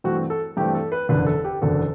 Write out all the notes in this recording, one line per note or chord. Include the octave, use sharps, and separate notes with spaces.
G2 E3 A3 C4 F#4
A4
G2 E3 A3 C4 G4
A4
B4
F#1 E2 D3 B4
A4
G4
F#1 E2 D3 A4